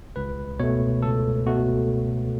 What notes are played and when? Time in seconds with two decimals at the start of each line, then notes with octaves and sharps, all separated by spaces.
0.16 C#2 B4
0.60 B2 A3 C#5
1.02 C#2 A4
1.46 B2 A3 F#4